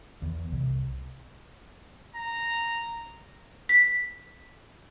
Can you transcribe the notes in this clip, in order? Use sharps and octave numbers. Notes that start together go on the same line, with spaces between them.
E2
C2
A#5
B6